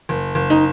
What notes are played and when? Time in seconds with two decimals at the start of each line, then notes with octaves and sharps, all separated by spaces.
0.09 F#1
0.35 F#1
0.50 D#4